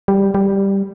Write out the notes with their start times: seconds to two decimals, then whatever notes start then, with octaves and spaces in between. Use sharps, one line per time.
0.08 G3
0.35 G3